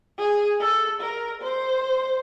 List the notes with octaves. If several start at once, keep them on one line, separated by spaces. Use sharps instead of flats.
G#4
A4
A#4
C5